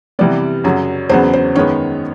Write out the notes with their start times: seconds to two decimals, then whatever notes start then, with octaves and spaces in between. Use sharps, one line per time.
0.19 C3 E3 G3 B3 D5
0.64 F#2 C#3 F#3
1.09 E2 C#3 F#3 B3 C5
1.33 C5
1.55 F#2 D#3 G#3 B3 C#5